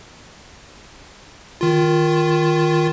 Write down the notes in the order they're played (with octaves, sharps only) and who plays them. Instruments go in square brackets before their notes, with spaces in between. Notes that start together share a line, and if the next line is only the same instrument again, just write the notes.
[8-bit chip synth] D#3 F4